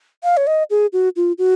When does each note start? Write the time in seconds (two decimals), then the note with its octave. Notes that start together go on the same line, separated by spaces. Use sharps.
0.24 F5
0.37 C#5
0.47 D#5
0.70 G#4
0.93 F#4
1.16 F4
1.38 F#4